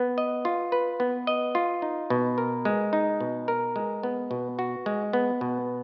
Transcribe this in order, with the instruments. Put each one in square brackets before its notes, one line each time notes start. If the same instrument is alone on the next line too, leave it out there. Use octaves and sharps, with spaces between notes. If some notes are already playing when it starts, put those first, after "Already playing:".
Already playing: [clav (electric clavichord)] B3
D#5
F4
B4
B3
D#5
F4
D#4
B2
A#4
G#3
D#4
B2
A#4
G#3
B3
B2
F#4
G#3
B3
B2